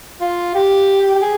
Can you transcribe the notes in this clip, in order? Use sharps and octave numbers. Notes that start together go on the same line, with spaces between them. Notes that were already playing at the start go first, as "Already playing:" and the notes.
F4
G4
G4
G#4